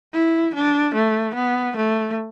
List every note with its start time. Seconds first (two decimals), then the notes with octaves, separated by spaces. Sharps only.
0.13 E4
0.55 D4
0.95 A3
1.35 B3
1.77 A3